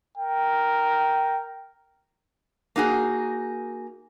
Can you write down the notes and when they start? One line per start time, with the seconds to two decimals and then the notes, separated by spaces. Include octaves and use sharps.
0.18 A#4 G5
2.76 A#3 D#4 F#4 G#4